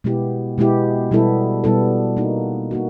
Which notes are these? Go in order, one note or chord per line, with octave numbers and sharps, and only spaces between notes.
B2 G#3 B3 E4 G4
B2 G#3 B3 E4 G4
B2 G3 B3 E4 A4
B2 G3 B3 E4 A4
A#3 D#4 F#4
A#3 D#4 F#4